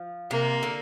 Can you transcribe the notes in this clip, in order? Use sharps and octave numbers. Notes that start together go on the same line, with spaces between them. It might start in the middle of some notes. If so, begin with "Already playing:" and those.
Already playing: F3
C3 A#3
D3